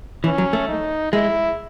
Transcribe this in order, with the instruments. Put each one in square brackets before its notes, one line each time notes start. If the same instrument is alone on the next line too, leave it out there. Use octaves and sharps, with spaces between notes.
[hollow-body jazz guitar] E3 [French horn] C#4
[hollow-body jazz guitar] F#3
A3
[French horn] D#4
[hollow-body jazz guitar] G#3 [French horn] E4